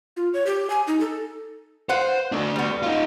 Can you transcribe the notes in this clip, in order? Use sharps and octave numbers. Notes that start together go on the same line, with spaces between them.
F4
C#5
G4
G#5
D#4
A4
B4 C5 F5 F#5
A3 D4
G3 B3
D#4 F4